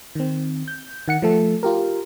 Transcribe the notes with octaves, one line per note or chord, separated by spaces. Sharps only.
D#3 C4
G6
D#3 F#5 C#7
F3 A3 A4
F4 G4 A#4